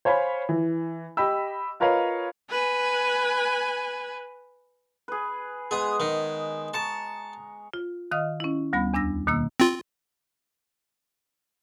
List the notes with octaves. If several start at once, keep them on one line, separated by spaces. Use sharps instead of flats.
C5 C#5 F5 G#5 B5
E3
G4 D#5 G5 B5 E6
F4 A#4 B4 C#5 D#5 F5
B4 G#5
G#4 B4
G#3 B3 G#4
D#3
A5 A#5 C#6
F4
D#3 D#5 F5 D#6 F6
C#4 E4
D2 G3 B3 B5
E2 D4 E6 A#6
B2 D#3 A#3 E6
C4 F4